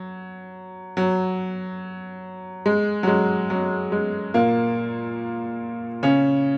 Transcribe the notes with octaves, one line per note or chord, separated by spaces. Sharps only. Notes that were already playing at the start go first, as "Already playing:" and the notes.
Already playing: F#3
F#3
G#3
F#3
G#3
F#3
G#3
A#2 A#3
C#3 C#4